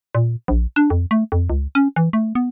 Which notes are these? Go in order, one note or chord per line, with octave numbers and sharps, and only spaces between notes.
A#2
A#1
D4
F2
A3
F2
C#2
C#4
E3
A3
B3